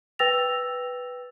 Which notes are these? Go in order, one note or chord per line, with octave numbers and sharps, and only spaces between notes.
B4 G5 E6 A6 A#6 F7